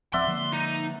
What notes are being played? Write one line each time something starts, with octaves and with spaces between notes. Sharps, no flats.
D1 F3 C4 D5 E5 F#5 C6
D3 F3 A#3
D#4